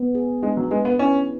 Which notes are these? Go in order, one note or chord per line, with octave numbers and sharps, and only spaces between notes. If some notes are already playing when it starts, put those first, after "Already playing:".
Already playing: B3
G#4
G#3 D4
F#3
G#3 B4
B3
C#4 E4